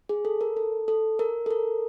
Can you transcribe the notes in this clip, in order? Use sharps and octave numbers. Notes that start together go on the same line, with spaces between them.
G#4
A4
A#4
A4
A4
A#4
A4
A#4